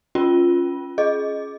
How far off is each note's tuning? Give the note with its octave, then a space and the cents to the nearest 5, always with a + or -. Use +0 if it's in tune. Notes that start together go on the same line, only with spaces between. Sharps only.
C#4 +0 F4 +0
G#4 +20 D#5 +0